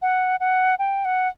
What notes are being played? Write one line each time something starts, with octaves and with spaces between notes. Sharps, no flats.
F#5
F#5
G5
F#5